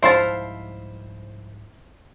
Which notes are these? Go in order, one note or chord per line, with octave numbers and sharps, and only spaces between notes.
C2 G#2 F3 E4 C5 F5 A5